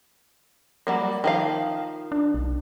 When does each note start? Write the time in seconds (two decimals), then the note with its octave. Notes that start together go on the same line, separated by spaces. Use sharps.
0.87 F#3 G3 A#3
1.24 D#3 F3 F5
2.12 D4
2.34 B1